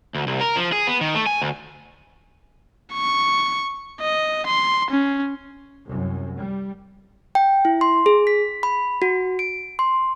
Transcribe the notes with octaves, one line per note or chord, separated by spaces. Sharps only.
D2
C2
A#4
F3
G#4
B3
D#3
A3
G#5
D2
C#6
D#5
C6
C#4
C2 F#2
G3
G5
E4
C6
G#4
B6
B5
F#4
D7
C6